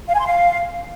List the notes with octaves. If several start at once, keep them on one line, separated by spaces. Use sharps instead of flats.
F5
G#5
C6
F5